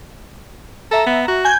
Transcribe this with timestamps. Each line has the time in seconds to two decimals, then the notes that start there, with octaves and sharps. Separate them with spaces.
0.91 A4 E5 A#5
1.06 B3
1.28 F#4
1.45 G#5 G6 G#6